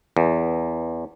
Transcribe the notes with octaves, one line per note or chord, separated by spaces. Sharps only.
E2